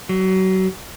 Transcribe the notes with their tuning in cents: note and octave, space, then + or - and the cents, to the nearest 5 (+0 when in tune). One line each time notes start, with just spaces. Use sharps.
F#3 +30